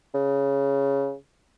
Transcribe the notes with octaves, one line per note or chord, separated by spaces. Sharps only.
C#3